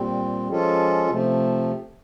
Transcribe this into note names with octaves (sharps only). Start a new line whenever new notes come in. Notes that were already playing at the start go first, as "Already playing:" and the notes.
Already playing: A#2 G3 C4
F3 G#3 C#4 F4 A4
C3 F3 A3